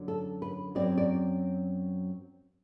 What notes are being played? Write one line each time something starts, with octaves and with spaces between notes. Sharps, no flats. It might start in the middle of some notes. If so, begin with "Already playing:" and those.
Already playing: F#2 D3 F#3
A4
B4
F#2 F#3 C4 D5
D5